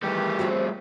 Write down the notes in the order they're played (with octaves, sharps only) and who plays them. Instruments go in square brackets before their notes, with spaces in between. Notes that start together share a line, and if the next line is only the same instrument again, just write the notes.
[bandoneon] D#3 E3 G4 [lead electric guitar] G3 A3
[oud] C4 F4 F#4